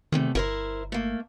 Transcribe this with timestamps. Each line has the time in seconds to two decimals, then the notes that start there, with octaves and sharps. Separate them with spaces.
0.12 E2 C3 D#3 A3
0.35 G1 E4 A#4 C5
0.92 A3 A#3